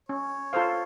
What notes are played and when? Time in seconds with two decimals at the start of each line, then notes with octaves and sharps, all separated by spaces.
0.09 C#4 C#5
0.53 F4 A4 C5 F5